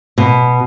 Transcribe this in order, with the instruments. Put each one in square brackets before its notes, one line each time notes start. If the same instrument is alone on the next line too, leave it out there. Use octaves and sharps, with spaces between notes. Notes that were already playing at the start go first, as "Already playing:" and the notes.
[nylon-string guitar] B2